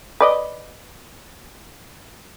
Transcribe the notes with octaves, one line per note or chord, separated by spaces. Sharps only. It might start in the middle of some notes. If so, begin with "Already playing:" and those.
B4 D5 D#5